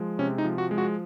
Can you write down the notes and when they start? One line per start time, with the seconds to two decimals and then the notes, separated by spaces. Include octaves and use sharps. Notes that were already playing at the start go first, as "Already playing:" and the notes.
Already playing: F3 G#3
0.19 C3 C#4
0.38 D#4
0.44 F3
0.58 F#4
0.71 G#3
0.78 F#4